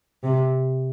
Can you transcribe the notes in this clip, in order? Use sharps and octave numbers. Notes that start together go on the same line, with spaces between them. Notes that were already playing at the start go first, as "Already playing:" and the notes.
C3